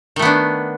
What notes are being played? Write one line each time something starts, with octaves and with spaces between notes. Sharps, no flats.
D#3 A3 B3 D4